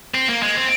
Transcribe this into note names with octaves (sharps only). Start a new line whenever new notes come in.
C4
A#3
G#3
C4